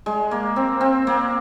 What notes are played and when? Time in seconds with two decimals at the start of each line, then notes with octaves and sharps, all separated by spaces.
0.06 G#3
0.31 A#3
0.56 C4
0.81 C4
1.07 A#3